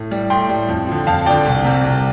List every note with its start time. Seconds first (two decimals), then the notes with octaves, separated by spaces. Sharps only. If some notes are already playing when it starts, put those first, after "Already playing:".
Already playing: A2
0.11 G3
0.30 A2 G5 C6
0.49 G3
0.69 F2
0.87 D3 F3
1.07 F2 F5 A5
1.26 D3 F3 D5 G5
1.45 C2
1.64 C3 G3
1.83 C2